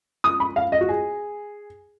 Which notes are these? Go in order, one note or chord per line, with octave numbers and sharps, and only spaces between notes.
D#6
B5
F5
D#5
F#4
G#4